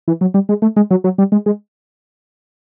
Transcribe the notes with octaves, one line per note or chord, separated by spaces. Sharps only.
E3
F#3
G3
G#3
A3
G#3
F#3
F#3
G3
G#3
G#3